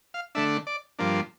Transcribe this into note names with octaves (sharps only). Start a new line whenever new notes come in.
F5
D3 A3 D4 E5
D5
G2 F3 A#3 D4